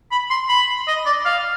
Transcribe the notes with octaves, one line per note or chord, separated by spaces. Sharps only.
B5
C6
B5
D#5
D5
F5